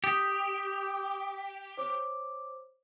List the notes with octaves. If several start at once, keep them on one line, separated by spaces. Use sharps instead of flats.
G4 D#6 B6
C5 C#5 D6